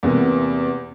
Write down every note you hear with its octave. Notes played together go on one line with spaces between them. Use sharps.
E2 C3 A#3 B3